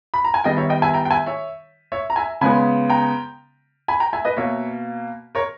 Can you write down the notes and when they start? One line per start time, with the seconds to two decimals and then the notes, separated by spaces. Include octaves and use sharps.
0.14 B5
0.24 A#5
0.34 G#5
0.44 D#3 G3 B3 D#5 G5
0.57 C#5 E5
0.69 D#5 G5
0.82 E5 G#5
0.94 G5 A#5
1.05 G5
1.11 E5 G#5
1.26 C#5 E5
1.92 C#5 E5
2.10 A#5
2.16 E5 G#5
2.41 C#3 G#3 B3 G#5 B5
2.89 G5 A#5
3.88 G#5 B5
4.00 G5 A#5
4.13 E5 G#5
4.25 B4 D#5
4.37 B2 A#3 C#5 E5
5.35 A#4 C#5